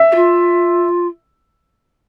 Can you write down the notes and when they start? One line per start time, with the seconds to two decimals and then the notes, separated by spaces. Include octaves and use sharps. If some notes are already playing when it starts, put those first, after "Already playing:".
Already playing: E5
0.12 G4
0.15 F4